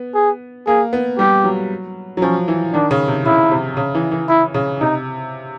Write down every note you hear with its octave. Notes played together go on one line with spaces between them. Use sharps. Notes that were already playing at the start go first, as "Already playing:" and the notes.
Already playing: B3
G#4
A#3 G#4
B3
G3 G4
F#3
F#3
F3 C#4
E3
D#3 D4
C#3
C3
C#3 E4
C3
C#3
E3
E3
E4
C#3
C3 D#4